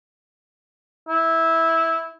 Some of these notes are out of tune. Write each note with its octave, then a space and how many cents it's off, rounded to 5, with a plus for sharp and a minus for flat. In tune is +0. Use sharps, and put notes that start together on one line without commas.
E4 -10